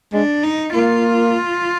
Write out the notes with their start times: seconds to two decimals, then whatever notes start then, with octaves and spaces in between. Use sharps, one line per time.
0.13 G#3 D4
0.44 D#4
0.75 A#3 F4